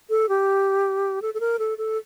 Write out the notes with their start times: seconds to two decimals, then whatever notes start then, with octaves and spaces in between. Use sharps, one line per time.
0.10 A4
0.29 G4
1.22 A4
1.34 A4
1.40 A#4
1.59 A4
1.78 A4